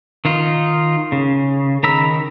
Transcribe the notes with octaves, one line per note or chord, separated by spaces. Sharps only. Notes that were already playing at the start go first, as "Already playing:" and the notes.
D#3 D#4 F4
C#3
D#3 A#5 B5 E6